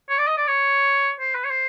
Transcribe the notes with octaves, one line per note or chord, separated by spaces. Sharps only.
C#5
D5
D#5
D5
C#5
C5
B4
C#5
C5